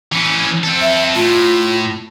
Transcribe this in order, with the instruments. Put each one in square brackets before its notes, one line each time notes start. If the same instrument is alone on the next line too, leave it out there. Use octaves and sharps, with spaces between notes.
[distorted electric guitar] E3 C#4
C4 A4
[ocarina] E5
[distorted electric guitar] A2 [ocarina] F4